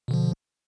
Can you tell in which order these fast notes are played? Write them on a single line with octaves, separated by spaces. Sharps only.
B2 D3 F3